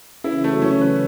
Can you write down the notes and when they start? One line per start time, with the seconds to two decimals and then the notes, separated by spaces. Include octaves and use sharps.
0.24 C#3 E3 E4
0.44 A3
0.50 F#3
0.62 C#3 E3 C#4
0.81 B4